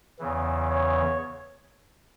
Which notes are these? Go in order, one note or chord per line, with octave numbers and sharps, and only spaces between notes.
E2 C#3 E3
C#5